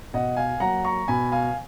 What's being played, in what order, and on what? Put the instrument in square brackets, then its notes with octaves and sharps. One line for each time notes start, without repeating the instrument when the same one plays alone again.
[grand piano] B2 D#5 F#5
F5 G#5
F#3 A#3 F#5 A#5
A#5 C#6
B2 G#5 B5
F5 G#5